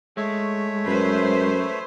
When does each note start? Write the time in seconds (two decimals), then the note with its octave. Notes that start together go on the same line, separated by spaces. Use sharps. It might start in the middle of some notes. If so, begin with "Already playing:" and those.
0.17 G#3 A3 C#5 E5
0.87 F#2 B4 C5